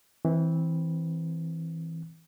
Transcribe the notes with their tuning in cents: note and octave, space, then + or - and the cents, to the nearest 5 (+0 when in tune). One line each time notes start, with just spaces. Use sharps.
E3 -15 C4 +0